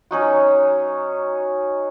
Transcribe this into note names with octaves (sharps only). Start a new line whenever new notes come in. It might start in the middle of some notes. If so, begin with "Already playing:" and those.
F#3 C#4 D#4 F#4